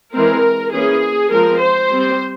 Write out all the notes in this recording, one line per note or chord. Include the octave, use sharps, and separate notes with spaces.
E3 G#3 C4 A#4
E3 A#3 C#4 G#4
F3 G#3 C4 A#4
C5
G3 C4